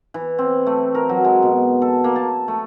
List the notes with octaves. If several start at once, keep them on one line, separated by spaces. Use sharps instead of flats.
E3
C4
A3
A#4
F#3
G#3
B2
A4
A#3
A5
A3